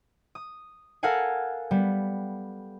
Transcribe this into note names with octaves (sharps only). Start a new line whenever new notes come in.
D#6
A4 A#4 F5 F#5 G#5
G3 B3